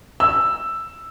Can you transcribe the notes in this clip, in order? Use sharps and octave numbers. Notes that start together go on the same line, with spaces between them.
E6